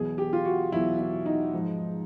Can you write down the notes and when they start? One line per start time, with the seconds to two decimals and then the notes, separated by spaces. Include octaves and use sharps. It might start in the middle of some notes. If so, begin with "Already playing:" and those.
Already playing: E2 B2 F#3 G#4
0.18 G4
0.33 F4
0.45 F#4
0.72 E2 B2 F#3 E4
0.99 E4
1.26 D#4
1.54 G#2 F3